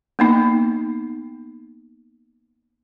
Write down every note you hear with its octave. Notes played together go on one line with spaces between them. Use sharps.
A#3 B3 D#4